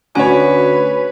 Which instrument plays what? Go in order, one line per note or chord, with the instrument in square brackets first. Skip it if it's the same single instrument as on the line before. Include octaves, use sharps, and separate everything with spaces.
[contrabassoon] D2 [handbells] C#4 G#5 [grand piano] F#4 C#5 [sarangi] B4